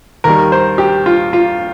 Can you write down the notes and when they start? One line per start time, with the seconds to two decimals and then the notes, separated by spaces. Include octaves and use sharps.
0.24 D#2 D#3 G3 A#4
0.52 C5
0.78 G4
1.06 F4
1.33 F4